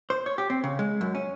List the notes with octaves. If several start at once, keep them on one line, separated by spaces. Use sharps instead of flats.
C5
C#5
G4
C4
C#3
G#3
F#2
C#4